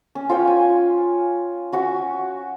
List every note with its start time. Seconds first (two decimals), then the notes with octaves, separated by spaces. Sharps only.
0.15 C#4
0.29 F4 C#5 G5
0.47 G#5
1.72 C#4 F#4 C#6